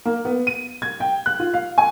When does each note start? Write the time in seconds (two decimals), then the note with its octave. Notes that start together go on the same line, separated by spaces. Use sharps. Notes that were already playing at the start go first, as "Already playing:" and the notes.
0.05 A#3
0.25 B3
0.47 D#7
0.82 G#6
1.00 G5
1.26 F#6
1.40 F4
1.54 F5
1.78 G#5